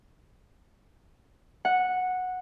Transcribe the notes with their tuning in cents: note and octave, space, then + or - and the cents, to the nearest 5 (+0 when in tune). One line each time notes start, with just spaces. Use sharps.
F#5 -10